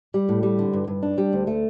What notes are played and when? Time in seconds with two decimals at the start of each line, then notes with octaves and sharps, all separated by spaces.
0.14 G3
0.29 A2
0.43 G3
0.59 D3
0.73 G2
0.88 G2
1.03 D4
1.18 G3
1.33 D2
1.47 A3